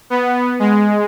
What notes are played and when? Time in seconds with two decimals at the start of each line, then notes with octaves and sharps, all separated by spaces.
0.10 B3
0.59 G#3